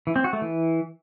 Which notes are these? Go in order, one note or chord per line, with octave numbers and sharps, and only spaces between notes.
E3
C4
F#4
A3
E3